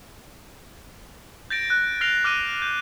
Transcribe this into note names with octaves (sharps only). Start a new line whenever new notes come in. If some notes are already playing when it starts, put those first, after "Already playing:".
G6 A6 A#6 D7
F#6
F6 A#6 C7 F7
D6 F6 F#6 A#6 D#7
G6